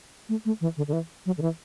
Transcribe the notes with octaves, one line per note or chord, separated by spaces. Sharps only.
A3
A3
E3
D3
D3
E3
F#3
D3
E3